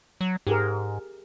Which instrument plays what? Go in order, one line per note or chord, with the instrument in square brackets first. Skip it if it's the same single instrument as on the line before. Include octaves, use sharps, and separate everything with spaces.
[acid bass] F#3
[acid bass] G#2 [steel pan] G4 G#4 A#4